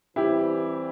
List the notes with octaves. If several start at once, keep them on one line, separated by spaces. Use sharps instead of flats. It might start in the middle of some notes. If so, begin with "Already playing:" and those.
E3 G3 C4 E4 G4